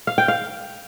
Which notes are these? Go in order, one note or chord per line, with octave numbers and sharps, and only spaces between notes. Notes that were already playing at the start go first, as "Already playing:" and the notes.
F5
G5
F5